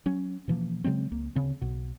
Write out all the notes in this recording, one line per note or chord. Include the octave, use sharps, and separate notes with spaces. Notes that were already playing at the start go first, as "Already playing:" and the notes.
F#3 C#4
B2 E3 F3 A#3
C#3 F#3 G#3 C4
C#2 A#3
D2 C#3 C4
B1 B2